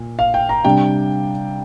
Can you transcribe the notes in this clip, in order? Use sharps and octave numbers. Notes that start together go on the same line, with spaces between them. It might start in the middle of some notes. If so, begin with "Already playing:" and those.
Already playing: A#2
F5
G5
A#5
C3 G3 D4 G5